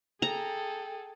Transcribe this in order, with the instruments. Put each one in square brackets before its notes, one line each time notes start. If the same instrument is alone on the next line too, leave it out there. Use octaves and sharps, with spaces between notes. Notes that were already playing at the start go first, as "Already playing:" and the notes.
[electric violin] G#4 A4 [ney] G5 [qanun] A#5